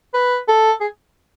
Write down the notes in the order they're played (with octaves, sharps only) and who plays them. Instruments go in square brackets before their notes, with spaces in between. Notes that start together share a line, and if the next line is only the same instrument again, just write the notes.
[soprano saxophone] B4
A4
G#4